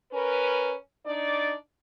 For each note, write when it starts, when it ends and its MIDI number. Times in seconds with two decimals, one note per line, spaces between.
0.12 0.74 61
0.12 0.74 70
0.12 0.74 71
1.06 1.54 62
1.06 1.54 63
1.06 1.54 74